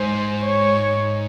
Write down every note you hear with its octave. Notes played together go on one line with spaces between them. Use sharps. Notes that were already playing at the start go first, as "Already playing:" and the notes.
Already playing: G#2 C5
C#5